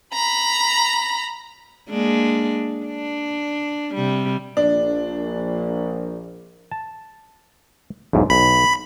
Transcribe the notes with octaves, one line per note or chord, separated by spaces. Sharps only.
A#5 B5
G#3 A#3 D4
D4
C3 G3
A#1 D4
A5
B1 E2 G#2
B1 B5